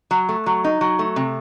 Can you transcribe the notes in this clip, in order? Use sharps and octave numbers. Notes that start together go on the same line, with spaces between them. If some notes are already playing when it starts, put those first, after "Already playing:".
F#3
A3
F#3
D#4
F#3
A3
C3